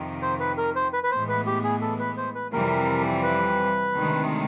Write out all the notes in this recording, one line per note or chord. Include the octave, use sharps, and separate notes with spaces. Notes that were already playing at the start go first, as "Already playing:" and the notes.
Already playing: F2 C3 D#3
C5
B4
A#4
C5
B4
B4
A2 E3 G#3 B3 C5
B4
G4
G#4
A4
B4
C5
B4
F2 C3 E3 G3 A#4
B4
D2 C3 D#3 G#3